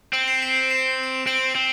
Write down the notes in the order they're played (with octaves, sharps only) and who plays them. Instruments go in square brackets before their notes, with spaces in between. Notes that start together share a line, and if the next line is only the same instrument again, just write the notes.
[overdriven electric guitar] C4 [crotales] D7 F#7
[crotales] C7 E7
B6 D7
B6 D7
C7 E7
D7
E7
[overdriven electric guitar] C4 [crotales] D7 F#7
[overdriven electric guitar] C4